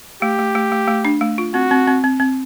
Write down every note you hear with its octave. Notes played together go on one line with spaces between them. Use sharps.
A3 G4
A3
A3
A3
A3
D4
A3
F4
C4 F#4
C4
C4
C4
C4